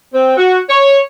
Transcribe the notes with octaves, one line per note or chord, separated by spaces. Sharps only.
C4
F#4
C#5